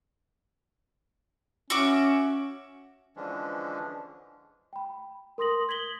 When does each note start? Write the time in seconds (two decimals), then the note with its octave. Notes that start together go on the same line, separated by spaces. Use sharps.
1.70 C#4 F#4 E5 D6
3.16 D3 E3 F3 G#3 C#4 D4
4.73 G5 B5
5.38 A#4 C6 D#6 A#6 F#7
5.69 G#6 B6 F#7 G7